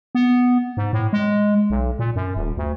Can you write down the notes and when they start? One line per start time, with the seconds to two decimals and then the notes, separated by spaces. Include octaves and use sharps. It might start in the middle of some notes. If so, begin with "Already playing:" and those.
0.15 B3
0.77 G#2
0.93 A2
1.13 G#3
1.70 B1
1.99 A#2
2.16 F#2
2.36 D#1
2.57 D2